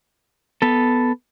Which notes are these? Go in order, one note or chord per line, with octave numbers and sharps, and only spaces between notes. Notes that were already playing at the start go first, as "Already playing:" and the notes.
B3 A4